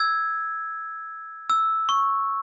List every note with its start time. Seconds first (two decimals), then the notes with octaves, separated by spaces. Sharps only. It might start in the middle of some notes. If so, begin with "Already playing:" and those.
Already playing: E6 G#6
1.50 E6
1.89 C#6